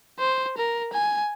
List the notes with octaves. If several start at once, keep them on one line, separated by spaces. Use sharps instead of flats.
C5
A#4
G#5